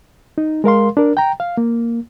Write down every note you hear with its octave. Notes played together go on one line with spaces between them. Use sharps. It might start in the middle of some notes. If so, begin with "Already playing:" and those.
D#4
G#3 A#4 F5 C6
D4 A#4
G5 A#5
F5
A#3